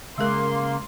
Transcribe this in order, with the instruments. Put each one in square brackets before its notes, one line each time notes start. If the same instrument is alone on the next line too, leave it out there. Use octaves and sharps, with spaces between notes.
[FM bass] C#3 [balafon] G#3 A#4 [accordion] A#3 [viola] C6